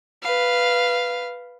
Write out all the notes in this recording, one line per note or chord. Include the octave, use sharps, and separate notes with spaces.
B4 F5